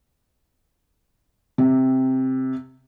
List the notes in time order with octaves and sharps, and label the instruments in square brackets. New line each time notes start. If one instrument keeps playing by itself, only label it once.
[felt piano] C3